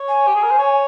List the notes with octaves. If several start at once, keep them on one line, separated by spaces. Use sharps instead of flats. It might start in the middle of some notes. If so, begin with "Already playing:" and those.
Already playing: C#5
G#5
G4
G#4
A#4
C5
C#5